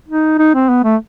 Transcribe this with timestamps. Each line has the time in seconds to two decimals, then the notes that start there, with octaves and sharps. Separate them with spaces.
0.08 D#4
0.39 D#4
0.54 C4
0.69 B3
0.84 A3